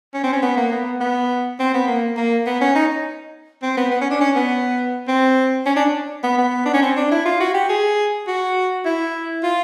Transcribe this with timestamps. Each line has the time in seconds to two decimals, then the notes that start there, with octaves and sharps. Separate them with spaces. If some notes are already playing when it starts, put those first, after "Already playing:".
0.14 C#4
0.23 C4
0.33 C#4
0.43 B3
0.57 A#3
0.72 B3
1.01 B3
1.60 C4
1.74 B3
1.88 A#3
2.17 A#3
2.46 B3
2.61 C#4
2.75 D#4
3.62 C4
3.77 B3
3.91 B3
4.01 C#4
4.10 D4
4.21 C#4
4.36 B3
5.08 C4
5.66 C#4
5.76 D4
6.24 B3
6.38 B3
6.66 D4
6.74 C#4
6.82 C4
6.97 D4
7.11 E4
7.26 F4
7.40 F#4
7.54 G4
7.69 G#4
8.28 F#4
8.85 E4
9.43 F4